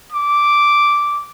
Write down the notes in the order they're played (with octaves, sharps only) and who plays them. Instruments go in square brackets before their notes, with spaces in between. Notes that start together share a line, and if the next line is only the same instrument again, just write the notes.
[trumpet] D6